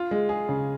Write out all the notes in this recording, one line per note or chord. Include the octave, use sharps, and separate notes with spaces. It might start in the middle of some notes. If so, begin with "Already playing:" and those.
Already playing: F4
G#3
G#4
C#3